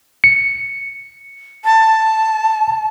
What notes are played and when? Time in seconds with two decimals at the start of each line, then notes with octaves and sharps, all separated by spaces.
0.24 C#7
1.65 A5